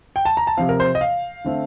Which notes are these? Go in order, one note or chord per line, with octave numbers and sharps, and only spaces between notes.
G5
A5
A#5
A5
C3 F3 C4 F5
A#4
C5
D#5
F5
D3 A3 C4